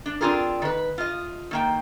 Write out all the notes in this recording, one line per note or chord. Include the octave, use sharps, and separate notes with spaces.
D4
C4 D4 F4 G#4 A#4
D#3 B4
F4 D#5
D#3 A#3 G5